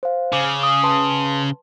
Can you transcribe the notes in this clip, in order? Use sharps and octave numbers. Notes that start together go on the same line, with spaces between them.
C5 F5
C#3 D6
D#6
B4 A5 C6